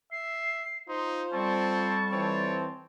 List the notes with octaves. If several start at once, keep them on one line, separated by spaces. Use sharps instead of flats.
E5 C7
D#4 F4 C5 C6
F2 G3 C4 A5 C#6
E3 C4 C#5